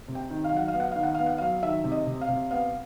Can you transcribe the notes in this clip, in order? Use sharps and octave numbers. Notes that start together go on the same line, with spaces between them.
C3
G5
D#3
F5
F#3 F#5
F5
B3
F#5
D#3 F5
F#5
B3 F5
F#5
F#3 F5
D#3 E5
C3
D#5
C3
F5
C3
B3 F5